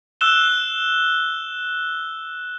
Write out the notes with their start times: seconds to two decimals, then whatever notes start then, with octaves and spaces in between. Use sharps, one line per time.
0.21 E6 F#6 E7 G7